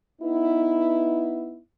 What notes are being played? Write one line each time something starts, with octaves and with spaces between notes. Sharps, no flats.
B3 D#4 E4